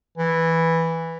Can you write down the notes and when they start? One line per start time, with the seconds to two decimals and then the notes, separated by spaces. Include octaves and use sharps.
0.18 E3